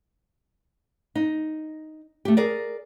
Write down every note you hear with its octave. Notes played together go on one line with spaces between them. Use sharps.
D#4
A3 G4
G#4 A#4 D5